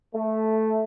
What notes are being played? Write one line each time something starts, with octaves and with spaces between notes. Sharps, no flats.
A3